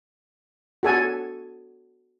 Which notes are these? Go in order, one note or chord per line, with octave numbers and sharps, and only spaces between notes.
F#4 A4 G#5